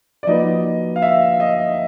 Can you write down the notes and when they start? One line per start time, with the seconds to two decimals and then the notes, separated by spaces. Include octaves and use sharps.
0.23 D5
0.27 F3 A#3 D#4 F#4 B4 D#5
0.96 F5
1.02 E5
1.40 D#5